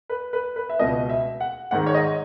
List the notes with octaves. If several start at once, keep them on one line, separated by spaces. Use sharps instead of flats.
B4
B4
B4
E5
C#2 B2 D#5
E5
F#5
G#2 D#3 F#5
C#5
D#5